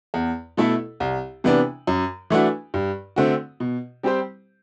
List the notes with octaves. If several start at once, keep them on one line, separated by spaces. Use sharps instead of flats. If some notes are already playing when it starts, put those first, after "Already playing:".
E2
B2 A3 E4 A4
C2
C3 E3 B3 D4
F#2
E3 A3 D4 F#4
G2
D3 A3 C4 F#4
B2
G3 C4 G4 C5